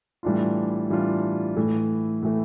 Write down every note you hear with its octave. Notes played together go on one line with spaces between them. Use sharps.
A2 E3 G3 D4 F4
A2 E3 G3 D4 F4
A2 E3 A3
A2 E3 A3